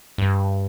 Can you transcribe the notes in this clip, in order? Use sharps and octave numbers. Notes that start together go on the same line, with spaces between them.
G2